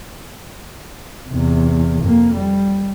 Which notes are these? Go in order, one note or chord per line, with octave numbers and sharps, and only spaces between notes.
E2 C3
F2 A#3
G3